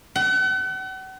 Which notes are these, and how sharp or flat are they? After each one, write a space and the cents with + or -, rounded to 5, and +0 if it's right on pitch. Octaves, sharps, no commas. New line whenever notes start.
F#5 +40